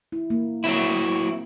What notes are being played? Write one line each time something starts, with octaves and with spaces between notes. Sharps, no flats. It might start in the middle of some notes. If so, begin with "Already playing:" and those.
E4
A#3
F#3 C4 E4